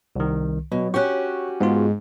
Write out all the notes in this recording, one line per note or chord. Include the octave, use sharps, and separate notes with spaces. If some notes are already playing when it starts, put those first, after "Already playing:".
C2 D#3
B2 F#3
C#4 F#4 G4 C#6 F#6
G#2 B3 F4